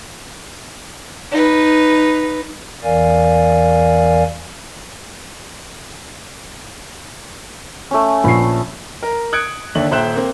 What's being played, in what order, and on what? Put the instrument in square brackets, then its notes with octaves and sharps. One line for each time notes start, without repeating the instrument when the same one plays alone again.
[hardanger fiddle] D#4 B4
[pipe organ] E2 E3 A#4 D5 F5 G#5
[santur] A3 C#4
[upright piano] A#1 C7 [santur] B4
[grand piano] A#4
D#6 F#6 G#6 C#7 D7
D#2 D3 D4 E5 F#7
D#1 C5 E5 G5 F#6 E7
A#3 C4